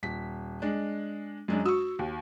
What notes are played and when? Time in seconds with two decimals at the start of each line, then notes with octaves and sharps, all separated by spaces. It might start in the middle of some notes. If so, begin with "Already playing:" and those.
0.03 D#1 B6
0.62 G#3 D4
1.48 F#2 G#3 D4
1.66 F#4 C#6 E6
1.99 D#2